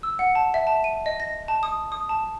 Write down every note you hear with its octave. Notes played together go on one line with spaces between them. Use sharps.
E6
F#5
A5
E5
A5
D#7
D#5
A#6
A5
D#6
D#6
A5